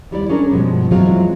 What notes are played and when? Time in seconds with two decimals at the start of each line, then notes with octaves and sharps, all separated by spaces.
0.11 D#2 G3 E4 D5
0.29 C#4 D4 G#4 A#4
0.51 G2 B2 F3 G#3
0.91 E3 F#3 G#3 C4 F4